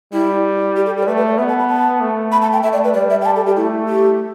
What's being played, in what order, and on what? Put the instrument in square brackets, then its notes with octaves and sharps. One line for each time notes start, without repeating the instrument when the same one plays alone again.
[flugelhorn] G3 [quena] E4
[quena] G4
A4
A4
D5
[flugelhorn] A3 [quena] B4
[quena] B4
D5
[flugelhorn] B3 [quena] E5
[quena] A5
B5
A5
[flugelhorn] A3
[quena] B5
A5
G5
[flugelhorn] A3 [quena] E5
[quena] D5
B4
[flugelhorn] G3 [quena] D5
[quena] E5
G5
A5
A4
G4
[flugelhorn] A3 [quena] E4
[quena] G4